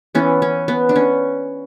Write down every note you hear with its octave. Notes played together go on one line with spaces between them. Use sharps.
E3 B3 C#4
C#4
B3
D4
C#4